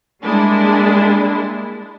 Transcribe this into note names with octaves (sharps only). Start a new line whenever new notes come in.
G3 G#3 A#3 D4 E4